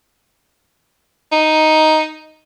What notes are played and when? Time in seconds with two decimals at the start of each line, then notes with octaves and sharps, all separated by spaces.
1.32 D#4